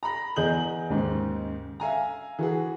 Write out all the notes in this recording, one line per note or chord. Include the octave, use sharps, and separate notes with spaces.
A#5 B5 A#6
E2 G#4 D#5 G6 F#7
D#2 G#2 C#3
E5 F5 G#5 A#5
E3 F#4 G#4